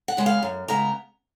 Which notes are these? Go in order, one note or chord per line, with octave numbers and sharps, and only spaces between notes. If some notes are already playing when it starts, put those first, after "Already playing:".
F#5
C#3 G#3 B3
F5
F#2
C#3 G#3 B3 A#5